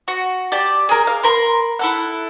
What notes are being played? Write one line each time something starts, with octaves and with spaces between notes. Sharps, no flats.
F#4
G4 D5 A5
G#4 A#4
F5
A#4 B5 C6
E4 A4 F#5